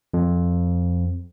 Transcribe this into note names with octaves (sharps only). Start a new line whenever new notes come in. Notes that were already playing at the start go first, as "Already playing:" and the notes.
F2